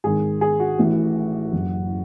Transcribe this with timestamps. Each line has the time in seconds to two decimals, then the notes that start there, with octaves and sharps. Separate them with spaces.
0.04 G#1 G#2 D#3 G#4
0.41 G#4
0.60 F#4
0.78 A1 A2 E3
1.53 F#1 F#2 E3